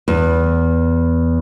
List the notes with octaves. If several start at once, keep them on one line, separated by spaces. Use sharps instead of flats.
E2